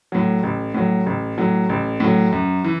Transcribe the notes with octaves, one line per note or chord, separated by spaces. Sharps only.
A2 F#3
A1
A2 F#3
A1
A2 F#3
A1
A2 F#3
F#2
E3